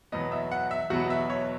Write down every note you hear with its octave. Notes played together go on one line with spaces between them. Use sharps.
E2 B2 F#3 B3 D#5
E5
F#5
E5
E2 B2 F#3 B3 F#4
E5
C#5